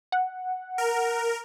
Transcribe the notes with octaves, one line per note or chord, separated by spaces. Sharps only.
F#5
A#4